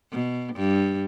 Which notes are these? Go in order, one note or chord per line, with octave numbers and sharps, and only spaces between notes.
B2
G2